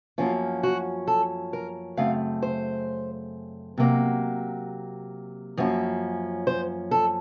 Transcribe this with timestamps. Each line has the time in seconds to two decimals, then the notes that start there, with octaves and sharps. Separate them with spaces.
0.18 F#2 F3 A#3 C#4 F4
0.63 F#4
1.08 A4
1.53 A#4
1.97 F#2 C#3 A3 C4 F5
2.42 C5
3.78 C3 F#3 A#3
5.57 F#2 F3 A#3 C#4
6.47 C5
6.91 A4